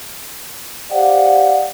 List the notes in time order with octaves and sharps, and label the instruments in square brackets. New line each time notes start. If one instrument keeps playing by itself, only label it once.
[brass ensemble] G4 C5 D5 F5 F#5